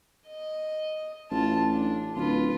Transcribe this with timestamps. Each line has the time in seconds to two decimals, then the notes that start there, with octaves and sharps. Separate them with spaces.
0.27 D#5
1.31 A1 F4 A5
1.72 D4
2.16 D1 F4 B4